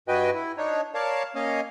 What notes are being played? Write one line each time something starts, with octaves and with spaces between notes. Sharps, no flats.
G2 F#4 B4 D#5 G5 G#5
E4
D4 D#4 C#5
A#4 C#5 D5 F5 A5
A#3 C#4 C#5 D#5 F5